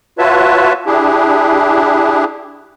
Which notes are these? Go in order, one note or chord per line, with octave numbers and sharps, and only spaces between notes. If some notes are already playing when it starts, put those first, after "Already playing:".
F4 F#4 B4 C#5 E5 A5
D4 E4 G4 G#4